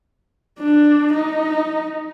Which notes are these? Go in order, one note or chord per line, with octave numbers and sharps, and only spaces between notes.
D4
D#4